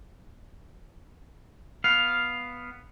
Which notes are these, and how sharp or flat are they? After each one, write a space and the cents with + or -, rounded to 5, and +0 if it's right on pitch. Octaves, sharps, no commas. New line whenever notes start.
B3 +0 F5 +5